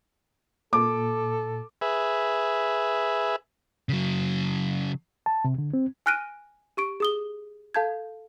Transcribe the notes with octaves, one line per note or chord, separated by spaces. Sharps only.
A#2 A4 D6
G#4 B4 E5
C#3 F#3
A5
C3
D3
C4
G#5 F6 F#6 A#6 D7 D#7
G4 C#6 D7
G#4 D#6 G7
A4 F5 A5 G6 G#6